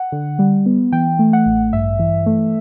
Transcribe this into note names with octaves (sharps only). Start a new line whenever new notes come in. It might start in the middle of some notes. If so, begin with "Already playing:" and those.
Already playing: F#5
D3
G3
B3
E3 G5
A3
F#5
A1
G2 E5
E3
A3